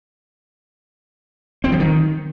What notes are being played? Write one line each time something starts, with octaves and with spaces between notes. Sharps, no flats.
C4
F3
D#3